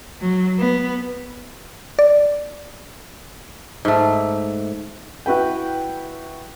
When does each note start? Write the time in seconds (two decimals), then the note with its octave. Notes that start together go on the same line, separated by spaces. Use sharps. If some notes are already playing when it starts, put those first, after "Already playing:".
0.21 F#3
0.59 B3
1.99 D5
3.85 G#2 A3
5.26 E4 F#4 B4 G5